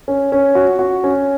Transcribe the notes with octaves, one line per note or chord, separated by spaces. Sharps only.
C#4
C#4
F#4
F#4
C#4